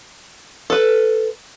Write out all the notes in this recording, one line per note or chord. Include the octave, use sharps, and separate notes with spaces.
A4 B4